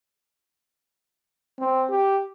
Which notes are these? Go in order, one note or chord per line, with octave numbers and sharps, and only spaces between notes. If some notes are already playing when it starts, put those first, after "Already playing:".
C4
G4